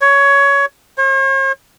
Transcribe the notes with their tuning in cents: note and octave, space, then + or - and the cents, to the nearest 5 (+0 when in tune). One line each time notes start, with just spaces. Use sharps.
C#5 +15
C#5 -45